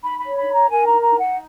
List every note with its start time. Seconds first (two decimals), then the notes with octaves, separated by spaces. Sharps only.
0.02 D#4 B5
0.19 B5
0.25 C#5
0.36 B5
0.47 D#4
0.53 A#5
0.69 A#4 G#5
0.86 A#5
0.91 D#4
1.03 A#5
1.14 D#4 F#5